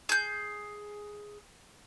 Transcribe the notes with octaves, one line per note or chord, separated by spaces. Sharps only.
G#4 G6